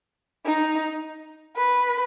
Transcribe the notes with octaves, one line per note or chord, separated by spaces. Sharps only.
D#4
B4